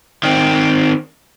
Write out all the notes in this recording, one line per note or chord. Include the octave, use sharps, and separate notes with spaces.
D#3 C4